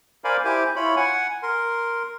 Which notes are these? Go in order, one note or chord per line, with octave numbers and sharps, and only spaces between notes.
A#4 C5 D5 F5 G#5 B5
E4 G4 C5 G#5 D6
E4 F4 C#5 B5
F#5 G#5
A#4 C6